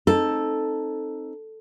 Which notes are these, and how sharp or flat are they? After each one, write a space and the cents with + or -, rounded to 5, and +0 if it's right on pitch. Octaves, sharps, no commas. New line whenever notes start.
C4 +30 D#4 +0 A4 +0